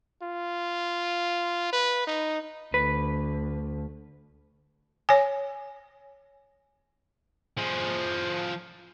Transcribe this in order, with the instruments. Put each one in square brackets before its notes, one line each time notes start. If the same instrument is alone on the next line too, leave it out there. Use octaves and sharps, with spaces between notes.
[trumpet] F4
B4
D#4
[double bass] D2 [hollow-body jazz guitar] B4
[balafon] C#5 G#5
[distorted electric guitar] F3 G#4